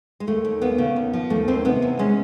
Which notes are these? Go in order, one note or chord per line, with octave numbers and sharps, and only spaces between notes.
G#3
D#2 A3
D#2
D#2 B3
C#3
D#2
F3
D#2 A3
D#2 C4
C3 B3
E2
G#3 C#4